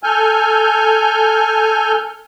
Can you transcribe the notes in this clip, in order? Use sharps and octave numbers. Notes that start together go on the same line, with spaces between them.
A4 G#5 F6 G6